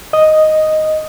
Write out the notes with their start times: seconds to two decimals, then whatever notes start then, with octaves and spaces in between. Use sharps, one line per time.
0.13 D#5 D#6